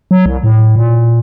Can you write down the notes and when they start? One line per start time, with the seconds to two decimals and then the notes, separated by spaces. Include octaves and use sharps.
0.11 F#3
0.26 C2
0.44 A2
0.76 A#2